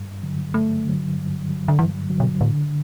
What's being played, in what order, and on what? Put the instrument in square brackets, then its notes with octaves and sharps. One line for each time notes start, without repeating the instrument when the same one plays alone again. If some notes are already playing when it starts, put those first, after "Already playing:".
Already playing: [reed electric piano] G2
D3 F#3
[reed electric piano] G2 [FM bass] A3
[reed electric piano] D3 F#3
G2
D3 F#3
[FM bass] D3
[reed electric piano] G2 [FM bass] E3
[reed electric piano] D3 F#3
[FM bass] B2
[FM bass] A2 [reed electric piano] D3